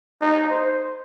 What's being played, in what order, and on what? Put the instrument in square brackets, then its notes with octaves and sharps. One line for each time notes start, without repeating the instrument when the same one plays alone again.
[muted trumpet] D#4
C5